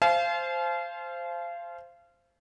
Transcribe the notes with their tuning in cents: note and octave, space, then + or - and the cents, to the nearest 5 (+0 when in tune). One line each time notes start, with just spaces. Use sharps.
C5 +0 F5 -25 A5 -45